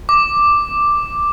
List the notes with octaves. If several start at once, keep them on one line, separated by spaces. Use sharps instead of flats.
D6